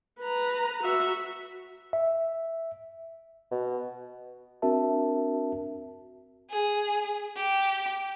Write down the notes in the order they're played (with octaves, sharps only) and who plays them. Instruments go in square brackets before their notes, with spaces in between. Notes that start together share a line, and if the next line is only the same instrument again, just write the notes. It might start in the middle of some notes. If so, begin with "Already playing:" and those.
[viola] B4 A#5
F#4 E5
[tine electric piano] E5
[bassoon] B2
[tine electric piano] C4 D4 F#4 A#4 E5 A5
[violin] G#4
G4